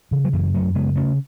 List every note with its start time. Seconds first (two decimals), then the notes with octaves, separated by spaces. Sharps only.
0.11 C#3 E3
0.25 F#3
0.33 F#2 E3
0.54 F#2 F#3 A3
0.75 C#3 G#3 B3
0.96 C#3 A3 C#4